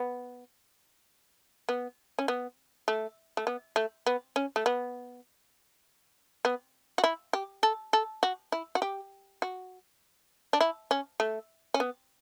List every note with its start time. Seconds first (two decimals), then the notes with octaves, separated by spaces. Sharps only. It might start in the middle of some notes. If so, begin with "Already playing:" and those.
Already playing: B3
1.69 B3
2.19 C#4
2.28 B3
2.88 A3
3.37 A3
3.47 B3
3.76 A3
4.06 B3
4.36 C#4
4.56 A3
4.66 B3
6.45 B3
6.98 F#4
7.04 E4
7.33 G4
7.63 A4
7.93 A4
8.23 F#4
8.52 E4
8.75 F#4
8.82 G4
9.42 F#4
10.53 D4
10.61 E4
10.91 C#4
11.20 A3
11.74 C#4
11.80 B3